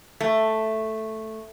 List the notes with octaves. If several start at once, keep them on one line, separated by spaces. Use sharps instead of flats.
A3